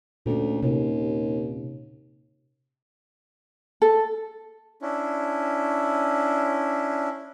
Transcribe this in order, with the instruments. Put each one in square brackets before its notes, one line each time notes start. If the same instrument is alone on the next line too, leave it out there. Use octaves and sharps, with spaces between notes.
[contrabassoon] D2 [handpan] A#2 C#4
[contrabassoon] D#2 [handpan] C3
[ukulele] A4
[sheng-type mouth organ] C#4 D4 E4